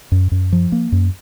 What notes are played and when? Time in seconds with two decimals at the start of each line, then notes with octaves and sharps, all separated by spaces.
0.12 F#2
0.32 F#2
0.52 F3
0.72 A#3
0.92 F#2